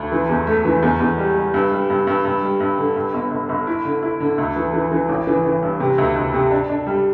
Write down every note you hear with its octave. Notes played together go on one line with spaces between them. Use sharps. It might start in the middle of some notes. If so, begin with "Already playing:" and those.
Already playing: D2
E3
E2
A3
E3
E2
E2
G3
G3
G2
G3
G2
G2
G2
G3
G2
D3
G2
G1
G1
G1
E4
D3
E4
D3
D2
E3
E3
E3
A1
E3
E3
G2
C3
D2
D2
C3
D4
D4
G3